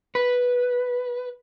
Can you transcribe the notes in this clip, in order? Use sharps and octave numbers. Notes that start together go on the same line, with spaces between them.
B4